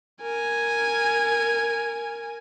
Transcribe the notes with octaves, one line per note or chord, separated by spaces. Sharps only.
A#4 G#5